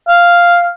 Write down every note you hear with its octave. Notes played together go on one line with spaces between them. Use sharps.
F5